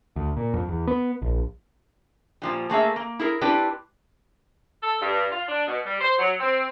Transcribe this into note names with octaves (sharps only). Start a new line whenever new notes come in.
D2
A#2
F2
E2
B3
A#1
A#2 F3 G3
A3 A#3 G#4 E5
A#3
E4 G#4 A#4
C4 D4 E4 G4 B4 D5
A4
G2
F4
D4
B2
G3
C5
F#3
C4